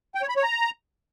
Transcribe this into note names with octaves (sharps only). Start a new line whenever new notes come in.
G5
C#5
B5
C#5
A#5